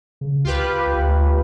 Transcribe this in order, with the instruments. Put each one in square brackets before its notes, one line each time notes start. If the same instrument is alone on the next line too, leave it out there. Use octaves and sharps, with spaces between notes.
[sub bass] C#3
[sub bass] C#2 [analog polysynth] F4 G4 B4
[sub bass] D2